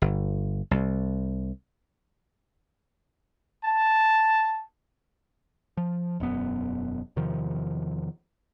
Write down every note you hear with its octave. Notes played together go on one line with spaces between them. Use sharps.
G1
C2
A5
F3
E1 F#2 B3
E2 C3 D#3 F3